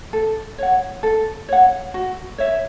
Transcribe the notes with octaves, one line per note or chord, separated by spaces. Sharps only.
A4
C#5 F#5
A4
C#5 F#5
F#4
C#5 E5